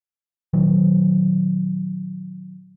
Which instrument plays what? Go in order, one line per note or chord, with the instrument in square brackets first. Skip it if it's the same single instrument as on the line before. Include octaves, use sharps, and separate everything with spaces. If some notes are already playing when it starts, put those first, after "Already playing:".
[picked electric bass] A#2 D#3 F#3